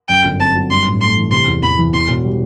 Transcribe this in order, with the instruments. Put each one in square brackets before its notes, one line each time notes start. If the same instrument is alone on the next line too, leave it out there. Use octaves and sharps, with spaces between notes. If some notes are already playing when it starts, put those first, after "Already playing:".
[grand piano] F#2 [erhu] G5
[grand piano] G1
[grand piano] C4 [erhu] A5
[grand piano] F#3
[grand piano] G2 [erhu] C6
[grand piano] A1
[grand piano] A3 [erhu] C6
[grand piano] E3
[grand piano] C3 [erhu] C6
[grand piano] E2
[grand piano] E2 [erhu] B5
[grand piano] E3
[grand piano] E2 [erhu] C6
[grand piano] E1
G3